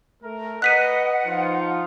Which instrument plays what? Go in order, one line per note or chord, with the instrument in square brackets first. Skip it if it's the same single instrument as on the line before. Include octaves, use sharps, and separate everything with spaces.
[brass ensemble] A3 A#4
[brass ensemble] B4 D#5 [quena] F#5 [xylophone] F#6 B6 D#7
[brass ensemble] F3 D#4 F4